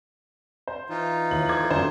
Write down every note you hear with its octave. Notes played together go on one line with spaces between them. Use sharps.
C5
E3 D#4 F4
D#2 E4 F#7
A4 C5 D6 G#6
F#2 D3 F#3 C5